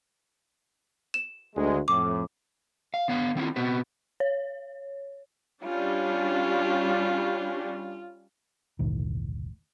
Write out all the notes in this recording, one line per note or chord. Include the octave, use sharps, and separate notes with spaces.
E7
D2 G#3
F2 A2 D6
F5
D3 B3 C#5 F5
D#3 C4 E4 F4
B2 B3 C4 F#4 B4
C#5
G3 C#4 D4 F4
E1 C2 A2 D#3